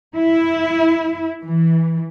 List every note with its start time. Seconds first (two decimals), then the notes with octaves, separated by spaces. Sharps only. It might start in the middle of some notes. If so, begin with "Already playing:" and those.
0.16 E4
1.42 E3